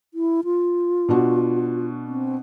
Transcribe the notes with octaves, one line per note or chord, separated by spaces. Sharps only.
E4
F4
B2 D4 F#4
C4